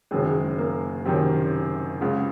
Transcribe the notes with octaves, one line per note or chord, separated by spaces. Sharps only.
F#1 F#2 D#3 G#3
G#3
A#3
F#1 F#2 C3 D#3 C4
C#2 C#3